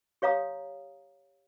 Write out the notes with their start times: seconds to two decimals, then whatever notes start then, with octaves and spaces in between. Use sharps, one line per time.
0.22 G4 C#5 F5 A#5 D#6